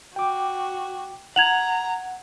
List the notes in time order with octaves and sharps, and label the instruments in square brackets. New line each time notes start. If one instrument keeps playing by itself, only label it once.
[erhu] F#4 [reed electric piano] G5 D6
[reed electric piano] F#5 [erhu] A#5 [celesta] G#6 F7 F#7